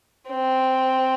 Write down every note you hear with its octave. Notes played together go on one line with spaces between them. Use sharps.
C4